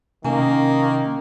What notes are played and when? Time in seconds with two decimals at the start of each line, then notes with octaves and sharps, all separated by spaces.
0.25 C3 D#3 A#3 C#4 G#5